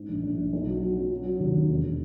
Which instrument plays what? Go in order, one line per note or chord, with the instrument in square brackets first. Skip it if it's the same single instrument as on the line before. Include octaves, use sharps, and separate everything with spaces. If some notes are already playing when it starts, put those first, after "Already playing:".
Already playing: [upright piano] G#2
A#1
A#1
A#1
B1
F#3
F#3
F#3
F#3
F#3
D#2
D#3
E1